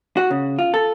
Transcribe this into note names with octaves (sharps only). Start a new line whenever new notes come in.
F#4
C#3
F4
A4